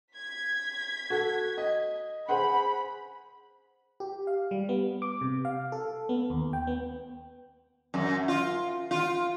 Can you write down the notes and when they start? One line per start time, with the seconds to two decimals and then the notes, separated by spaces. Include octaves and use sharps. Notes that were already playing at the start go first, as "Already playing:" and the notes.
0.15 G#6 B6
1.10 F#4 A4
1.57 D#5
2.29 G#4 C5 F#5 B5
4.00 G4
4.27 F5
4.51 G3
4.69 B3
5.02 D6
5.21 C3
5.45 F5
5.72 A4
6.09 B3
6.30 D#2
6.53 G5
6.67 B3
7.94 F#2
8.28 F4
8.91 F4